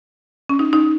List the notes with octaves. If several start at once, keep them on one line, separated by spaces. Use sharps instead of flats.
C#4
D#4
D#4